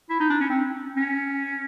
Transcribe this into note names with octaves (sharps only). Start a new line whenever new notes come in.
E4
D#4
D4
C#4
C4
C#4